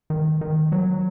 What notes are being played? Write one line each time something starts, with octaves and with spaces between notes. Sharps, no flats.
D#3
D#3
F#3